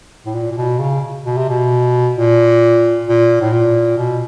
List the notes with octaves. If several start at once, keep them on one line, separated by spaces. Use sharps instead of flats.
A2
A#2
A#2
B2
C#3
B2
C3
B2
A#2
A#2
A2
A#2
B2